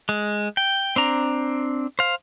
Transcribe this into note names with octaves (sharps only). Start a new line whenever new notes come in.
G#3
G5
C4 D4 A#5
C5 F5